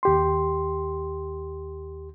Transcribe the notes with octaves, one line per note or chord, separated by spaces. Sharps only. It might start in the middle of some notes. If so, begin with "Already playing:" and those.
D#2 G4 C6